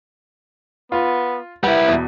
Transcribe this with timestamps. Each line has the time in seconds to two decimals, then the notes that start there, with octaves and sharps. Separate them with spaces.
0.92 B3 F4
1.63 G3 E4 B4 F#5
1.88 E2 B2